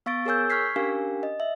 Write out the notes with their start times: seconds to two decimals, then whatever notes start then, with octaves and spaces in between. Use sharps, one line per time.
0.06 B3 F5 C#6 A6 D7
0.26 G#4 A#4 C#5 G#5 E6 G6
0.50 C#6 F6 G#6 B6 C7
0.76 C#4 D4 G4 A#4 F5 G#5
1.23 D#5
1.40 E5